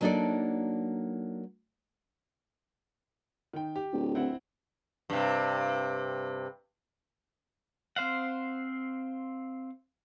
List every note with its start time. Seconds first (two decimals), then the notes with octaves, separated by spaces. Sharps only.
0.01 F#3 A#3 D4 D#4 A4 D5
3.53 D#3 G5
3.76 G4
3.92 D1
4.15 C4 E4 F#5
5.10 G2 C3
7.96 C4 C5 F5 F#5